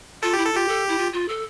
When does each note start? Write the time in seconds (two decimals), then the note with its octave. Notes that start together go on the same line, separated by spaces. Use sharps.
0.22 F4 A4
0.33 E4 G4
0.45 A4
0.52 F4 G4
0.68 A4
0.88 E4
0.98 F4
1.12 F4
1.28 A4